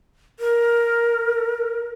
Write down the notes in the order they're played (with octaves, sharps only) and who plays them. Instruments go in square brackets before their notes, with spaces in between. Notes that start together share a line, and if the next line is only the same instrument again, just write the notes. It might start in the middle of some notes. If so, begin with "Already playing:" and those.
[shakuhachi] A#4